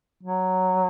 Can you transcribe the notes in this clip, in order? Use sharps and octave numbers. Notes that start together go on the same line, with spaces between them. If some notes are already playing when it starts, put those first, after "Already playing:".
F#3